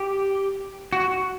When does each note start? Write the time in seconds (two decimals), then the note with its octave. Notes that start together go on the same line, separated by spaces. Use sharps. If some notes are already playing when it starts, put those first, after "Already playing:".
Already playing: G4
0.93 F#4